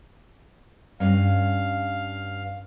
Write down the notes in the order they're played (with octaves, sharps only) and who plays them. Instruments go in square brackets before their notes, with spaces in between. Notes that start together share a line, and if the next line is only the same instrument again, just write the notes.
[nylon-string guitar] G2 C#4 [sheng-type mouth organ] F5